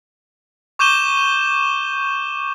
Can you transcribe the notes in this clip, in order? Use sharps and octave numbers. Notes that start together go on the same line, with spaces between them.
C#6 D6 G6 D#7 E7 G7